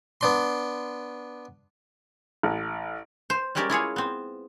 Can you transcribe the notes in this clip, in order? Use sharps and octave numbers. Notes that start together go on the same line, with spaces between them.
B3 D4 C6
A1
C5
G3 G#3 C#4 G4 A#4 D5
E4 F4 G#4 C#5
B3 C4